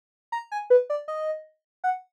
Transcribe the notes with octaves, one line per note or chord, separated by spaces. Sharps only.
A#5
G#5
B4
D5
D#5
F#5